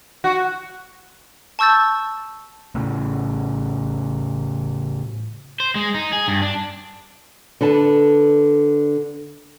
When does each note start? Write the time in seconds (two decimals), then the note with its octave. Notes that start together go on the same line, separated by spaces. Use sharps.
0.24 F#4
1.59 A5 C#6 E6 G6 A6
2.75 A2 C#3
5.60 C5
5.75 G#3
5.94 D#4
6.13 G#4
6.28 G2
6.42 D4
7.61 D3 A4 B4 D5 A5